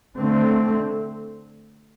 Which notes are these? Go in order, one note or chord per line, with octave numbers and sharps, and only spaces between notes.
D3 A3 C4